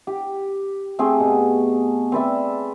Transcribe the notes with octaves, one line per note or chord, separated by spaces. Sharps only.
G4
A3 C4 G4 G#4
B2
C4 B4 D5 E5